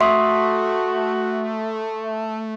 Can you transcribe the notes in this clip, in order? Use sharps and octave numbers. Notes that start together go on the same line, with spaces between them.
A3 F#4 E5 C6 C#6 D#6